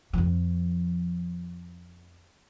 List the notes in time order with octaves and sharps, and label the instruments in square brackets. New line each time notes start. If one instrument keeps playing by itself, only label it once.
[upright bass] F2 F3